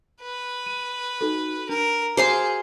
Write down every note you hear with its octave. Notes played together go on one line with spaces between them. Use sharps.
B4
D#7
D#4 F#4 A4
D4 A#4
F#4 G#4 C5 F5 C6 D6